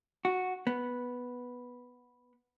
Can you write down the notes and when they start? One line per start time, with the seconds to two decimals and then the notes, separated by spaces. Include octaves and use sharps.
0.25 F#4
0.67 B3